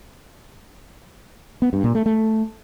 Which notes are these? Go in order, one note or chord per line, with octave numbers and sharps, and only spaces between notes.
B3
G2
A#2
A3
A3